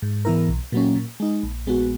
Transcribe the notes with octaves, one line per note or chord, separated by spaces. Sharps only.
G#2
E3 B3 E4 A#4
B1
A#2 F#3 A#3 C#4
A#2
G#3 D#4
A#1
A#2 G#3 B3 F#4